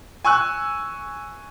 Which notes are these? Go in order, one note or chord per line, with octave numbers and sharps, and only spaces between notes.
G#5 C#6 E6 F#6